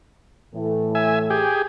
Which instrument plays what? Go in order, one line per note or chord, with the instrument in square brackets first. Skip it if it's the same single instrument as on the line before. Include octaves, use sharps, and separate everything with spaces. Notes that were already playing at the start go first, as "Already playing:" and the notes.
[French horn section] A2 E3 A3
[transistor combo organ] E5 G#5
G4 G#4